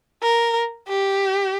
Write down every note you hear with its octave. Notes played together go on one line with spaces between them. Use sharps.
A#4
G4